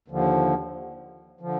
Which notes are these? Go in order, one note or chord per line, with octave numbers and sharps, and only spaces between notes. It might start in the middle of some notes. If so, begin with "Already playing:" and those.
D#2 D3 F3
D3 F3